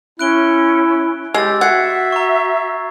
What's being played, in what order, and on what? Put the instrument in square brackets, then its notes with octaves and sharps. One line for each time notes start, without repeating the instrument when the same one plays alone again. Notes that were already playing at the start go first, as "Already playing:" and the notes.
[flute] C#4 [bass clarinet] E4 [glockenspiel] F#6 D7 G7
[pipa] G#3 [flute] G4 [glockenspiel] E6 A6
[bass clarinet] F#4 [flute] E5 [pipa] F#5 [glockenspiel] G#6 C7
[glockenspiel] A#5 C#6